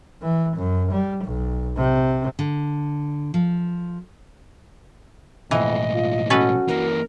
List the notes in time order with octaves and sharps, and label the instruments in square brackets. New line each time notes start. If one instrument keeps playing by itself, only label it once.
[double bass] E3
F#2
G3
B1
C3
[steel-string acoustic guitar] D3
F3
[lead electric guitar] B1 A2 [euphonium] F2 [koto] E3 [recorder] D#5
[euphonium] F4
[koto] C#4 A4 B4 [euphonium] F#4
[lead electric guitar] E3 A#3 [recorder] A#4